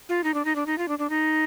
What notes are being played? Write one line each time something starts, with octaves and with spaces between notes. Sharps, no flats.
F4
D#4
D4
D#4
D4
D#4
F4
D4
D4
D#4